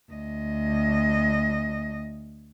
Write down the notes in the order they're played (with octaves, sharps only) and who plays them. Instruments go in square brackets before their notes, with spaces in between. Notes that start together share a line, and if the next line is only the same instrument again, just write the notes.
[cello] D2 D#5